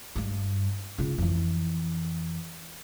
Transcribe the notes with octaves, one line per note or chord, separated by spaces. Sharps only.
G2 G3
C#3 F4
F2 E3